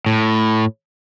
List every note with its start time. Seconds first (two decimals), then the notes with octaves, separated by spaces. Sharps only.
0.06 A2